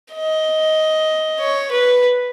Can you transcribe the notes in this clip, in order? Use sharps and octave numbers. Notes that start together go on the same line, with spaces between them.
D#5
C#5
B4